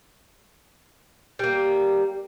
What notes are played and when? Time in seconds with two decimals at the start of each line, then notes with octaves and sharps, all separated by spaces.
1.39 G3 A#3